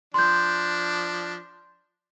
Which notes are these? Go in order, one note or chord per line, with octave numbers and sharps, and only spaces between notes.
F3 D4 C6 G6